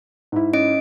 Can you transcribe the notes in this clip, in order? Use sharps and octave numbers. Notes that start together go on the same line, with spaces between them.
G#2 E4
C#4 D#5 D7